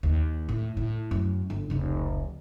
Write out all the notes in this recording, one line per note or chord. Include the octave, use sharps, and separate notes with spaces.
D#2
A2
A2
F#2
G1
F1 C#2